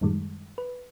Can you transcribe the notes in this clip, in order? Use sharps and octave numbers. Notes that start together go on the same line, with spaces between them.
F#2 A2 D#3 G3 G#3
B4